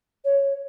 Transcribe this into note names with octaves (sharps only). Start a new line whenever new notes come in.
C#5